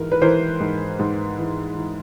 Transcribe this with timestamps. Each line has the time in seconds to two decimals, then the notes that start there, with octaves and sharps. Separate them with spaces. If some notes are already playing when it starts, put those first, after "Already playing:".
Already playing: G#2 E3 A#4
0.12 B4
0.22 E3 A#4 C5
0.60 G#2
0.99 G#2
1.39 E3
1.77 E3